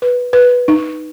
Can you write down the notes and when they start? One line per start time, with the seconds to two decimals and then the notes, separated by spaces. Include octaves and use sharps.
0.02 B4
0.33 B4
0.68 D#4